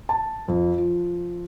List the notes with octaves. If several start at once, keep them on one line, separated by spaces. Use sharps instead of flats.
A5
F2
F3